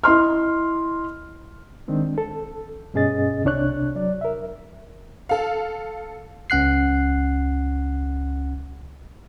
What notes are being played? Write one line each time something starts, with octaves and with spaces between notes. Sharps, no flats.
E4 D#5 C6 F6
D#3 G#3 C4 D4
A4
G2 B2 C#4 G#4 D#5 A6
C2 C3 D4 C#5 F#6
F#3 D5
A#4 E5
A4 F5
C#2 C#4 F#5 F#6 C7